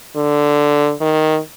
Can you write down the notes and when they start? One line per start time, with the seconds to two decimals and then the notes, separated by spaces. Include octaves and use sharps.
0.16 D3
1.01 D#3